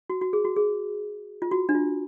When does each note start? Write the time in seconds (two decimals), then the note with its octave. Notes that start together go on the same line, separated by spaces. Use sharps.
0.10 F#4
0.21 F#4
0.33 G#4
0.45 F#4
0.56 G#4
1.42 F4
1.51 F#4
1.69 D4
1.75 F4